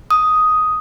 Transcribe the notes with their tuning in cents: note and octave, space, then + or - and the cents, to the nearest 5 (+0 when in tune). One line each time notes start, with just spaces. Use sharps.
D#6 +5